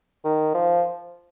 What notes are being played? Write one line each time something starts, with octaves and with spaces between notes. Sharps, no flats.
D#3
F3